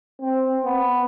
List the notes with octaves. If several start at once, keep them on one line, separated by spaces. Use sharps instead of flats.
C4
B3